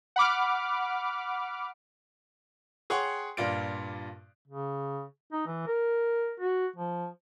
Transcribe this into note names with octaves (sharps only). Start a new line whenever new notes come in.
F#5 B5 D6 F6
G#4 C#5 F#5 G5 C6 C#6
G2 A#2 F4 D5 D7
C#3
D#4
E3
A#4
F#4
F3